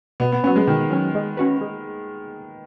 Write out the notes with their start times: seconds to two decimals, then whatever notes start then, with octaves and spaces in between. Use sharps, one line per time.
0.20 B2 B3
0.32 B3
0.44 F#3 B3 C#4
0.56 G#3
0.67 B2 D#3
0.90 F#3 C#4
1.15 G#3
1.37 C#4 F#4 B4
1.61 G#3